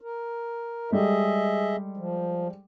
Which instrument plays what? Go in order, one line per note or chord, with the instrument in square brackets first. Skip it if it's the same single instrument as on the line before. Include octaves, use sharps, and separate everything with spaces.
[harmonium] A#4
[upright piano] G3 G#3 A4 [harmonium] G#4 D#5 E5
[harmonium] F3